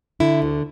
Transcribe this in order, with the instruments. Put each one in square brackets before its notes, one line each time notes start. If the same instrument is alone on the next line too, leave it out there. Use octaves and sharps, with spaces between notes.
[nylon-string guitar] D3 E4
D2